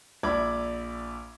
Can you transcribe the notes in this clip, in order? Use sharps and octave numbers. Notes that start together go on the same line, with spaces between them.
A#1 D5 E5 B5 D6 G#6